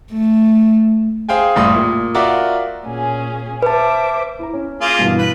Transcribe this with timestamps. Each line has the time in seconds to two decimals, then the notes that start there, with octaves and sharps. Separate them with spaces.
0.13 A3
1.29 G#4 C5 F5 G5 G#5
1.56 F#1 A2 G3 C6 D#6
1.74 A#2
2.15 F4 F#4 A#4 D5 E5 D6
2.85 A#2 C#4 G#4
3.62 B4 C5 E5 A5 D6
4.39 E4 A#5
4.53 C#4
4.81 A#3 F4 G#4
4.99 G2 B2 E3
5.19 B4